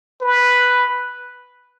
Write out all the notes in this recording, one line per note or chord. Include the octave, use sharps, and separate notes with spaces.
B4